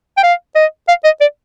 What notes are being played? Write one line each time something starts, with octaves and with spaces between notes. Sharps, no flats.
G5
F5
D#5
F5
D#5
D5